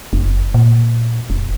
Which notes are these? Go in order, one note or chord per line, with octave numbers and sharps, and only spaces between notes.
F#1
A#2
F1